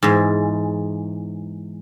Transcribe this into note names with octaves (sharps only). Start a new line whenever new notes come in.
E2 G#2